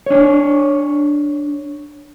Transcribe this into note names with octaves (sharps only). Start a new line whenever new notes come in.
D4 C#5